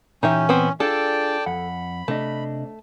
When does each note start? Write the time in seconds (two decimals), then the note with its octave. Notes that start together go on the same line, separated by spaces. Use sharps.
0.23 A#2 E3 C#4 D#4 G4 E5
0.49 B3 C4
0.80 D4 F4 G#4 A4 D5 G5 A5
1.46 F2 F#5 B5
2.08 C3 A3 D4 D#5